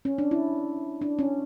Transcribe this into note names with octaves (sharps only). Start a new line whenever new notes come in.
C#4
D4
E4
D4
C#4